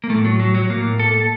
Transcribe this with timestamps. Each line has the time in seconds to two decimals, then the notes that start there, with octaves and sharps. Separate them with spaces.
0.04 A#3
0.10 A2 A3
0.25 F#3
0.40 F#3
0.54 F#3
0.70 A2 A#3
0.99 A4